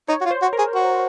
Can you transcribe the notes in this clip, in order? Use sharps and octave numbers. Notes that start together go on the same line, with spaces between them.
D#4 C#5
F#4
F4
C5
F#4
A#4
G#4
F#4